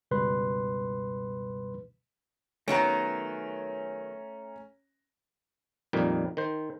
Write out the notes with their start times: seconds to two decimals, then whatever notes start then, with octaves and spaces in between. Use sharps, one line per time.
0.11 C#2 F#2 B2 G3 B4 C6
2.68 D#3 F#3 A3 B3 C#4 A#5 D7
5.93 F2 A#2 D#3 G3 D#4
6.37 D#3 C5